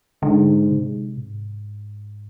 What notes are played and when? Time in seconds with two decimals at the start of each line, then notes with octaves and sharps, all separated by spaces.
0.23 G#2 D3
0.70 C3
1.17 G#2